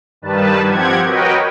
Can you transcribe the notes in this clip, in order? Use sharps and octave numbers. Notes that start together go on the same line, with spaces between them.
G2 D#3 G3 B4 A5
F3 C4 G4 F#5 G#6
F#4 A#4 B4 C#5 D#5 G5